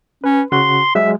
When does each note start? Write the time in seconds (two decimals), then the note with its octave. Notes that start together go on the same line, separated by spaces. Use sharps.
0.24 C#4 B4
0.52 C#3 F#4 C6
0.95 F#3 G#3 E5